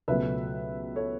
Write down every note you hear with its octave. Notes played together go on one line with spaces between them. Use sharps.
C#2 B2 F#3 A3 B4 E5
A4 C#5